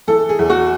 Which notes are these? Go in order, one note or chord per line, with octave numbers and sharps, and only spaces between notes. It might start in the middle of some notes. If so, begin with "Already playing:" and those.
E3 A4
G#4
E2
F#4